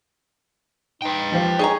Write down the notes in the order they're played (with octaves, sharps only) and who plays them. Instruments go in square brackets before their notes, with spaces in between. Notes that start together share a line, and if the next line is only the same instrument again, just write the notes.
[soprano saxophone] D#4 [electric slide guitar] B4 G5
[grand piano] F3 C5 F5 [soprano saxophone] G4
[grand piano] D#4 G#4 C#5 [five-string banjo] D#5 G#5 A#5